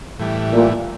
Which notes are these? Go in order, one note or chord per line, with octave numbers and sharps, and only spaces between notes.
A2 E3 G3
A#2